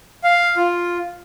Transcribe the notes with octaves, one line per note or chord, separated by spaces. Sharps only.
F5
F4